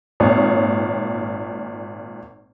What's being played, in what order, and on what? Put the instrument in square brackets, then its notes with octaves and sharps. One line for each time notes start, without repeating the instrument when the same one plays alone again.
[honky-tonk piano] G#1 A#2 C#5